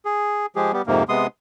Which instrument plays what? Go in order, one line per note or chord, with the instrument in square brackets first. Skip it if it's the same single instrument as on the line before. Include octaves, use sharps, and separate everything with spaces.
[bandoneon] G#4
F3 G#3 G4 G#4
G3 B3 G4
F2 G#2 C3 A#3
C3 G#3 B3 C6 D#6